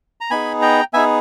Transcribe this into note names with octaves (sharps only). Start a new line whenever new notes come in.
A#5
B3 D#4 G#4 G#5 B5
G5 A#5
B3 D#4 G#4 E5 G#5